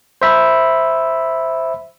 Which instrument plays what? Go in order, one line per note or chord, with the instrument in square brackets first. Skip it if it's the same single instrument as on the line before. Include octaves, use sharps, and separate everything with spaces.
[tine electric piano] C5 E5 B5